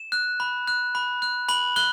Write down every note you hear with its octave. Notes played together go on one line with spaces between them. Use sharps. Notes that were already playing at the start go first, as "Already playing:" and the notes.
Already playing: E7
F#6
B5
F#6
B5
F#6
B5 F#7
F#6 G7